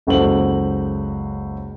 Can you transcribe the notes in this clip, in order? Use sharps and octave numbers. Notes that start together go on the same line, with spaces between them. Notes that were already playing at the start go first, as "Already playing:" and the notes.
F#1 C#2 F#4 A4 C5 F#7